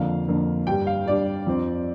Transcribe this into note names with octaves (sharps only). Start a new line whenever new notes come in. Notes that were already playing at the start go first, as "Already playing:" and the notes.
Already playing: F2 D3 A#3 D4 F5
F2 D3 A#3 D4
G2 G3 D4 G5
F5
G2 G3 D4 D5
F2 F3 C4